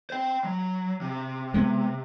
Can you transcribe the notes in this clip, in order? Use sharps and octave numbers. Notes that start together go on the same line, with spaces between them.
C5 G5
F#3
C3
G#3 B3